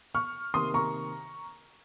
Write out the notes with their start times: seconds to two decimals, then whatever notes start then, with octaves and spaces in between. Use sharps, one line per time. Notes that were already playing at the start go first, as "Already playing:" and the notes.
0.14 C#6 F6
0.54 C3 D#3 A#3 C6 D#6
0.74 A#5 C#6